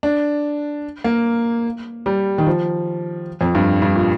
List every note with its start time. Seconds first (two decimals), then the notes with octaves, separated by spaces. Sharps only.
0.03 D4
1.04 A#3
2.06 G3
2.38 D#3
2.47 F3
3.41 F2
3.55 G2
3.82 G2
3.96 A#2